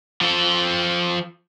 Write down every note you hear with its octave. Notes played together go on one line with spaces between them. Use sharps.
F3 A4